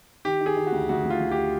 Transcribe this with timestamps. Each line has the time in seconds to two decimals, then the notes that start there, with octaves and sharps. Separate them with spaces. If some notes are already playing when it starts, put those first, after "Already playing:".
0.25 D#3 G4
0.41 D#3
0.46 G#4
0.57 D#3
0.67 F#4
0.72 D2
0.89 D2 F#4
1.05 D2
1.10 F4
1.21 D2
1.31 G4